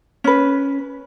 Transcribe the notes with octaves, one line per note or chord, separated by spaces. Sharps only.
C#4 B4